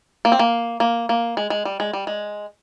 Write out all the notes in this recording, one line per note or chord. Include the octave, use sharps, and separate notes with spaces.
A#3
C4
A#3
A#3
A#3
G#3
G#3
G3
G#3
G3
G#3